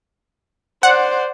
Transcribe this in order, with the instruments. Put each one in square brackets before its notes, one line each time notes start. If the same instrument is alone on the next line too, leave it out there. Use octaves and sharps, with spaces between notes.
[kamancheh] C5 D5 [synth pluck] F#5